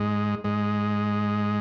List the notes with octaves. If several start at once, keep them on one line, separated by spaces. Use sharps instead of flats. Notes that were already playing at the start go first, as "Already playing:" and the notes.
Already playing: G#2 G#3
G#2 G#3